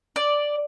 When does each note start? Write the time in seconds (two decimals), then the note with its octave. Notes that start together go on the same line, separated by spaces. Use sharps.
0.16 D5